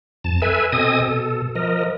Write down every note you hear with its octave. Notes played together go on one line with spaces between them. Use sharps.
F2 A5
A4 B4 E5 G#5
B2 C4 A4 D#5 G#5 D#6
B2 A4
F3 A#4 D#5